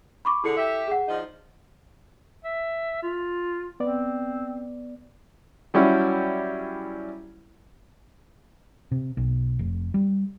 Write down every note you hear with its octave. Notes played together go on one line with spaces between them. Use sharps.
B5 C#6 D6
D3 E4 G#4 A4 C#7
G4 E5
G#4 F#5
F3 D4 D#4
E5
F4
B3 C4 D5
F#3 G3 C#4 E4
C3
B1
F1
G3